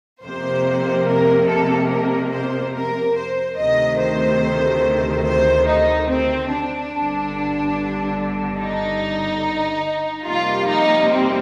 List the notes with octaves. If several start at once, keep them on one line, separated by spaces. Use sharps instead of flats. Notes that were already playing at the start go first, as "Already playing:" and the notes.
F2 C3 F3 A#3 C5
A#4
A4
A#4
C5
A#4
C5
D2 C3 D#3 A3 D#5
C5
C5
D#4
C4
D4
G1 G2 D3
D#4
F2 C3 G3 A#3 F4
D#4
C4